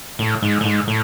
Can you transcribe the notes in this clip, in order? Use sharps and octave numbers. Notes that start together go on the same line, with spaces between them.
A2
G#2
A2
G#2
A2